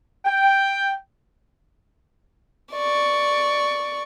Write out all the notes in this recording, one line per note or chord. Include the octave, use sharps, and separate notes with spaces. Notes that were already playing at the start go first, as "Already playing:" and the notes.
G5
D5 C#6